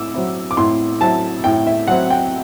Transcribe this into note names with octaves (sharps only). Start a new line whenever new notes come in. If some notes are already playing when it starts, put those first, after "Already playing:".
Already playing: A2 D6 E6
F#3 C4 E4
D6
A2 C6
F#3 C4 E4 A5
A2 G5
E5
F#3 C4 E4 F#5
G5